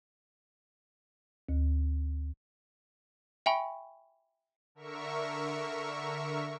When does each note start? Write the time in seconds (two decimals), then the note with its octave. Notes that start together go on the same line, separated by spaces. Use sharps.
1.49 D2
3.46 E5 G5 G#5 B5 C#6
4.75 D3 A#4 E5 C#6